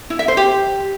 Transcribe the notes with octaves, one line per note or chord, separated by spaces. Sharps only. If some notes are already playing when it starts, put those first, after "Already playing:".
E4
E5
C5
G4